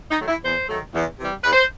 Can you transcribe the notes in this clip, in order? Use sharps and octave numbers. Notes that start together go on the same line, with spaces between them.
D#4
D#3 F#3 A3
E4
E2 C5
D#3 F#3 A3
E2
C3 E3 G3
E2 B4
C5